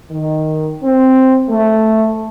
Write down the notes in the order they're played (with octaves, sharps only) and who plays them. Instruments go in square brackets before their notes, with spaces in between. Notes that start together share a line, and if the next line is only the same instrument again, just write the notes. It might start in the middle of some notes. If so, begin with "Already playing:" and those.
[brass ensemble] D#3
C4
A3